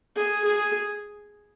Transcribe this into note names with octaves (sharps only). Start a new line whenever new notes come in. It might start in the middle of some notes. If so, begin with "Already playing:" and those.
G#4
G#4